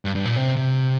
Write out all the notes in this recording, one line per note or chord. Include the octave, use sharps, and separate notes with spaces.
G2
G2
A#2
C3
C3